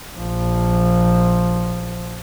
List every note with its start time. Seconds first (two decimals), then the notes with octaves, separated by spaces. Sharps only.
0.18 A#1 F3